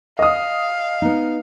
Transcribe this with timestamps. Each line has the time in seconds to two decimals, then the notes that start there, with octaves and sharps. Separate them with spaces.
0.19 D#5 F5 D#6
1.02 B3 D#4